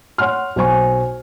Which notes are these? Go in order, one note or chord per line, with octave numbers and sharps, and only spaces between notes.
C#5 F#5 C6 F6
B1 C5 G#5 C#6